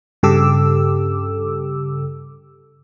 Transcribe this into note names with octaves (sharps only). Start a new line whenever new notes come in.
G2 C#3 G4 A4 D6 E6